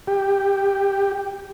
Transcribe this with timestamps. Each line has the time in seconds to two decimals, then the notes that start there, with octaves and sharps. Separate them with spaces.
0.07 G4